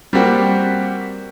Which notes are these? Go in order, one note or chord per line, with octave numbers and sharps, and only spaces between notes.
G3 A#3 C4 F#4 G4